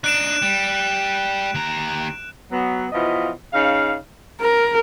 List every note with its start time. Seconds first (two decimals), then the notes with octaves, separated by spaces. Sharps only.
0.04 D4 D#4 F#6 D7 E7
0.42 G3
1.55 D#2 A#5
2.52 F#3 B3
2.92 B2 E3 F3 F4 D#5
3.53 C#3 D#4 F5
4.42 A#4